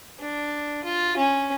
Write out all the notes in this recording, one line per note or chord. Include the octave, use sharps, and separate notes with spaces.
D4
F4
C#4